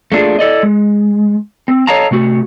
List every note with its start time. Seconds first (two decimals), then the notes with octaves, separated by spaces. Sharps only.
0.12 A3 A#3 D4 F4 G#4
0.39 E4 A4 D5 D#5
0.63 G#3
1.68 C4
1.87 A4 C#5 D#5 F5 A5 A#5
2.11 C3 A3 F#4